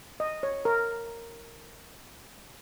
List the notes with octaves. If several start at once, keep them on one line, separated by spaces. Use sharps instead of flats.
D#5
C#5
A#4